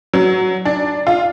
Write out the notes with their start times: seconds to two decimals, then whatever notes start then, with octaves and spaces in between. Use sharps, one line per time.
0.14 F#3
0.65 D4
1.07 F4